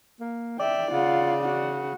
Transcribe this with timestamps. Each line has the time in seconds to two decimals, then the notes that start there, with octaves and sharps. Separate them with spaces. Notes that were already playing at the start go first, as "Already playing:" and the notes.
0.20 A#3
0.60 D5 E5 G5
0.92 C#3 F4 F#5
1.42 F#4 F#5